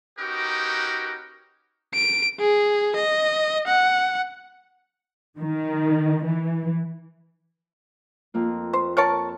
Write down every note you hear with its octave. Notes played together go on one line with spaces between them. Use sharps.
C#4 D#4 F#4 G4 A#4 B4
D7
G#4
D#5
F#5
D#3
E3
F2 A#3 F4
C5
A#4 C#5 A5